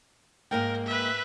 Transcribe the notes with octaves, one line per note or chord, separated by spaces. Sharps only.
G#2 A#3 A#4 G5
B4 E5